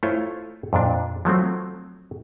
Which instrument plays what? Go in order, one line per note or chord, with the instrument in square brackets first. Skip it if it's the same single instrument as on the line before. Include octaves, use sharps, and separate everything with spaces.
[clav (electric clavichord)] A3 E4 F4 C5 C#5
F2 A#2 D4
F3 F#3 A3 C4